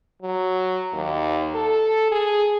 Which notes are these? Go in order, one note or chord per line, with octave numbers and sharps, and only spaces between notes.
F#3
D#2
A4
G#4